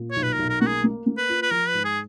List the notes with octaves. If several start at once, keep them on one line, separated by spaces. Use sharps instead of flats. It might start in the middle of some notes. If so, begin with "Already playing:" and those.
Already playing: A#2
C#5
B1
B4
A#4
B1
A#4
A#3 F#4
G#4
A#3
A#3
B4
F4
B4
F3 A#4
B4
G#2
G#4